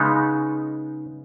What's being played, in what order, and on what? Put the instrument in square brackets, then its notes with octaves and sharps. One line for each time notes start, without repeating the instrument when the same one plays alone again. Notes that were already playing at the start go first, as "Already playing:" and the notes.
Already playing: [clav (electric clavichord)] C#3 G#3 B3 D#4